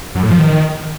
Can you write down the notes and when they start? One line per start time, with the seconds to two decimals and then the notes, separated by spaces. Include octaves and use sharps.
0.15 F#2
0.23 A2
0.31 F3
0.39 D#3